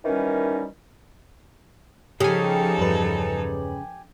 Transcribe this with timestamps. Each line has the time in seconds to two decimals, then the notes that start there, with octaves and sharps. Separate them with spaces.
0.05 F#2 D#3 E3 G3 C#4 D#4
2.20 C#3 F3 D#4 G4 A4 G#5
2.78 E2 G2 B4